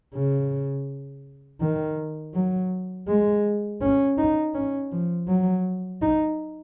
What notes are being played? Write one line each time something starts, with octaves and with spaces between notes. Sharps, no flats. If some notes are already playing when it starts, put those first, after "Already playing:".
C#3
D#3
F#3
G#3
C#4
D#4
C#4
F3
F#3
D#4